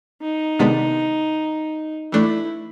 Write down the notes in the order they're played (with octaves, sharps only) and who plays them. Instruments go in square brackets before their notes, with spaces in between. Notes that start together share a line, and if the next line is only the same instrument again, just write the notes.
[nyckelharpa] D#4
[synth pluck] C3 D#3 G#3 B3 D4
[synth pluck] E3 A3 D4 [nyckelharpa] E4